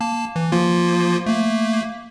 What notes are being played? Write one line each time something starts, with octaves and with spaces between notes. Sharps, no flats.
A#3 A5
E3
F3 A#3 F4
A3 A#3